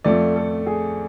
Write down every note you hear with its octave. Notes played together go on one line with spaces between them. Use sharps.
F2 F3 A3 D5
A4
G#4